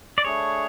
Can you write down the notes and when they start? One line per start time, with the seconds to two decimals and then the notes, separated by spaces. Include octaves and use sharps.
0.18 D5
0.25 A3 D4 G#4 C#5